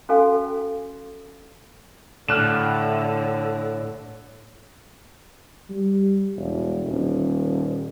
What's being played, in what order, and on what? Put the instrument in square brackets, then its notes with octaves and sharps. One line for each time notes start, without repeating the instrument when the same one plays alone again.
[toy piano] C#4 F#4 A4 F5 G#5
[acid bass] A2 [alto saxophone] D3 [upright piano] F6 F#6 E7
[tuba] G3
E1
D#1